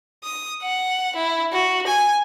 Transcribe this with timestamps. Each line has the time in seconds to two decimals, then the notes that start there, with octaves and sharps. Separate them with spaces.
0.23 D#6
0.63 F#5
1.16 E4
1.53 F#4
1.87 G#5